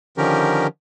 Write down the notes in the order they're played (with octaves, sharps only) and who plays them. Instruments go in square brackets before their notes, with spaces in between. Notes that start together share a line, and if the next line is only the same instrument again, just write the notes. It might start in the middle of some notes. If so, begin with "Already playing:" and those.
[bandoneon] D3 D#3 F3 C#4 G4 A#4